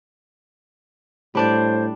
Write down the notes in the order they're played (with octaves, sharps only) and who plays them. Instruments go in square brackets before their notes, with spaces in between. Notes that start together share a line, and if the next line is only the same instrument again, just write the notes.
[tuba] A2 [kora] G3 D4 D5 [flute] C5